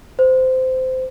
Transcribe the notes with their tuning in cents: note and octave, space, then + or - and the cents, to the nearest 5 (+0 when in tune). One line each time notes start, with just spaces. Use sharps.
C5 -20